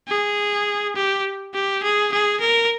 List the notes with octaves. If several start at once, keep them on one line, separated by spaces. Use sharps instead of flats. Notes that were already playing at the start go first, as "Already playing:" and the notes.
G#4
G4
G4
G#4
G#4
A#4